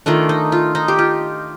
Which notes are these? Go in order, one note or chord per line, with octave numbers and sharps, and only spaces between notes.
D#3 A3 D4 F4
D#4
F4
D#4
G4
F4